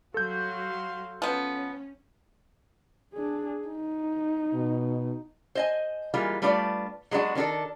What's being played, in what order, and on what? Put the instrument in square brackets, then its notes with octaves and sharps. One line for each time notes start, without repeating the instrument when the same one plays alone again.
[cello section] F#3 F#4 [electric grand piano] A4 G6 [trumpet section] F5 C6
[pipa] F3 B3 [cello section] C#4
[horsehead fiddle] D4 G#4
D#4
[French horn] B2
[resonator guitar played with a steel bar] C5 D#5 G#5
E3 G3 G#3 A#3 F4
G3 A3 D4 F4 B4 D5
F#3 G#3 B3 D4 F#4
D#3 C#4 D4 F#4 A4